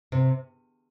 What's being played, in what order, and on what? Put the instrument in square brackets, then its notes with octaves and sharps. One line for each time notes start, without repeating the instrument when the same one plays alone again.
[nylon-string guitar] C3